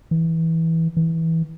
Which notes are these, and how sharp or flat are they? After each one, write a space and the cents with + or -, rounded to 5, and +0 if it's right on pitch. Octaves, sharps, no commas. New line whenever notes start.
E3 -15
E3 -15